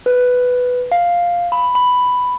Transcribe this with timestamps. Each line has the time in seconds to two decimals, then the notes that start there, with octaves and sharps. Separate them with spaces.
0.06 B4
0.92 F5
1.52 B5
1.75 B5